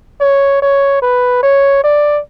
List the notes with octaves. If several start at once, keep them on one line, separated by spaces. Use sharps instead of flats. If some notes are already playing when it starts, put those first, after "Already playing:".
C#5
C#5
B4
C#5
D5